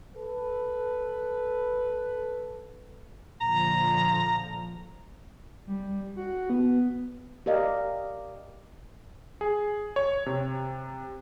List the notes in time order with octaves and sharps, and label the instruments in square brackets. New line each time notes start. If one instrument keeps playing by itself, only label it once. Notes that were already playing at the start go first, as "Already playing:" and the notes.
[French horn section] A4 B4
[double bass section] A#1 D3 F3 [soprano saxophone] A#5
[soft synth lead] G3
F#4
B3
[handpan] G4 A#4 D5 D#5 F5
[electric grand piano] G#4
C#5
C3